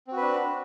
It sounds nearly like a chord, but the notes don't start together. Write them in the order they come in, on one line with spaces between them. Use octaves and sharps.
C4 F#4 B4 D4